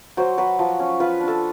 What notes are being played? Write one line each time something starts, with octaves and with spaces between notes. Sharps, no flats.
F#3 C5
F#3 B4
F3
C#4
F4 B4
D4
A4